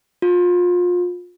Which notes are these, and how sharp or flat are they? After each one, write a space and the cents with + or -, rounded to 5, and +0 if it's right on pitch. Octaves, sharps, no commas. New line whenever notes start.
F4 +30